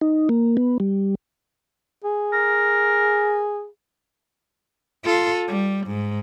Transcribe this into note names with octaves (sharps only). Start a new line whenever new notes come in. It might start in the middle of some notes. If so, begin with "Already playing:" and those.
D#4
A#3
B3
G3
G#4
A#4
F4 A4
G3
G#2